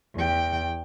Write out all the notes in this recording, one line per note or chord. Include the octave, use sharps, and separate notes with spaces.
E2 G5